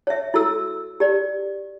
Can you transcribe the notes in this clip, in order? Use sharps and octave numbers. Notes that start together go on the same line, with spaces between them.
C#5 E5
E4 F#4 A4 E6
G4 D5